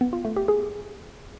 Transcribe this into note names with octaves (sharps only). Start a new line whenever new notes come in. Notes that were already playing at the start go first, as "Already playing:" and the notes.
B3
F4
A3
G4
G#4